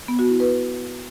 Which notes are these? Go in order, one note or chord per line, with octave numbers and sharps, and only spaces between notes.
B3
F#4
E4
B4